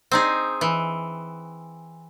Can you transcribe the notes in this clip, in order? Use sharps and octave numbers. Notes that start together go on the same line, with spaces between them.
C4 D#4 G#4
E3